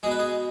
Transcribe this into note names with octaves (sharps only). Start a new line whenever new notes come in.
B2 G#3 G#4
B4
G#4